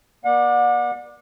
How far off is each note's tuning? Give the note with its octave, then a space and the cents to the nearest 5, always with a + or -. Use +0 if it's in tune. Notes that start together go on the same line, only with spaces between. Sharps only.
B3 -45 D5 +15 F#5 -35